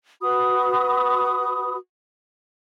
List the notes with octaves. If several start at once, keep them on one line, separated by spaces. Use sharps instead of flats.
F#4 B4 B5 D#6